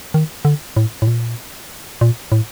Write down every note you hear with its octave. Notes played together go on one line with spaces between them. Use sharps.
D#3
D3
A2
A2
A#2
A#2
A2